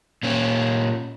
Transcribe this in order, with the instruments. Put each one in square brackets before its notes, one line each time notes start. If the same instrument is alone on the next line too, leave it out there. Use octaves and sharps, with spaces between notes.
[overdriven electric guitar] A#2 C#4